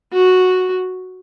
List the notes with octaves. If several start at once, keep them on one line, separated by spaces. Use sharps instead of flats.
F#4